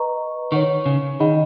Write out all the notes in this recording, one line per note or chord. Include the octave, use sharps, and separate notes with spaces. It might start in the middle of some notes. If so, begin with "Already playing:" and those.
Already playing: B4 D#5 A#5 C#6
D#3 C#5 F#5 C#6
C#3
D#3 D#4 G#4 D#5 F#5 B5